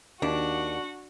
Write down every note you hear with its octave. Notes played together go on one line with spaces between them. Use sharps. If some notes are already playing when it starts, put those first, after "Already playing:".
D#2 D4 F#4